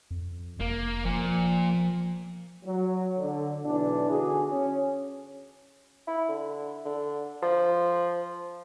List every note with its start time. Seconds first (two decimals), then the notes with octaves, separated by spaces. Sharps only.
0.11 F2
0.60 F1 A#3
1.05 A#2 F3
2.65 F#3
3.18 D3
3.64 B1 E3 D4
4.10 D3 F#4 G#4
4.51 C#4
6.07 E4
6.29 D3
6.85 D3
7.42 F3